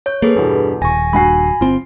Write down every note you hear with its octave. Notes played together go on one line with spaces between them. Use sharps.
C#5 G6
A#3 G#4 A4 B4
E2 G2 B2
D#1 G#5 C#6 A#6
G2 F#4 G#5 B5 C7
G1 C4 F4